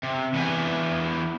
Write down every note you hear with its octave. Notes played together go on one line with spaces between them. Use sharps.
C3
E3 B3 D4 E5 G5 G#5